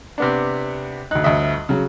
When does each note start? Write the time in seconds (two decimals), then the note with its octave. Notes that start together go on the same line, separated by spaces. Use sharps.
0.18 C3 B3 D4
1.11 D2 D#4 F#6
1.24 G1 D2 D#5 E5
1.69 C#3 F#3